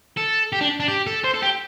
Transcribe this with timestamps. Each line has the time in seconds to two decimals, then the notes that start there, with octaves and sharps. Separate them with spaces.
0.17 A4
0.52 G4
0.61 D4
0.80 D4
0.88 G4
1.07 A4
1.24 C5
1.34 A4
1.42 G4